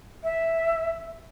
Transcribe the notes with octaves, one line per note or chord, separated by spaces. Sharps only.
E5